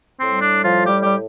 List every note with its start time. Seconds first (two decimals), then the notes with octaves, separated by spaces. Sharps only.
0.20 A2 G3 C4
0.41 D4
0.64 F3 F4
0.86 G3 G4
1.03 G3 G4